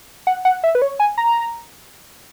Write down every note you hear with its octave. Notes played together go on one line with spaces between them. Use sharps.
F#5
F#5
E5
B4
C#5
G#5
A#5